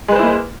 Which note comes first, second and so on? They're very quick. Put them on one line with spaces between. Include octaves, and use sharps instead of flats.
G#3 B4 C5 E4 A#3